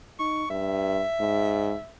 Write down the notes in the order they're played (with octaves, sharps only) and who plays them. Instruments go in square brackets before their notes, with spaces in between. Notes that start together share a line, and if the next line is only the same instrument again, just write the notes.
[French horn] D#4 [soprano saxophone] C#6
[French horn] G2 [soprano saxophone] E5
[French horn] G#2